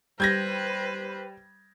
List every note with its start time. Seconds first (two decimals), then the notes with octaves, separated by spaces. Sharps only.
0.20 G3 B4 C5 G6 G#6 A#6